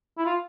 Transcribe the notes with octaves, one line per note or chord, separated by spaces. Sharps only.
E4
F4